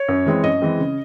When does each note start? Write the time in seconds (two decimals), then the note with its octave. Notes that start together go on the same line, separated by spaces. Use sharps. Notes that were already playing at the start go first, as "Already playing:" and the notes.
Already playing: C#5
0.09 F#2
0.26 E3 G#3 C4
0.44 F#2 D#5
0.61 E3 G#3 C4
0.79 C#3